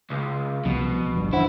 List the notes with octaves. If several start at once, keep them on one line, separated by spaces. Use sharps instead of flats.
C#2
C2 B2 F3 B3
G1 G2
F#2 E3 D4 E4 C5 F#5